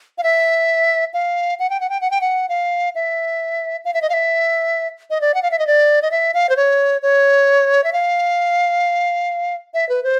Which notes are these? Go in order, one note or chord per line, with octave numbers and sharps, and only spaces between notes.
F5
E5
F5
F#5
G5
F#5
G5
F#5
G5
F#5
F5
E5
F5
E5
D#5
F5
E5
D#5
D5
F#5
F5
E5
D#5
D5
D#5
E5
F5
C5
C#5
C#5
E5
F5
E5
B4
C5